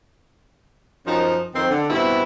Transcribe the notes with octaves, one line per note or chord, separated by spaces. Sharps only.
F#2 F3 D#4
F2 D#3 C4
D3
E2 G2 B2 B3 C4 E4